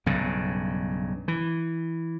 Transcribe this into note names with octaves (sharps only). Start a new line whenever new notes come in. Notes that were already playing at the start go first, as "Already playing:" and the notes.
B1 G2 C#3
E3